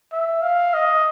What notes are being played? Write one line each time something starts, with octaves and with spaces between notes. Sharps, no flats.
E5
F5
D#5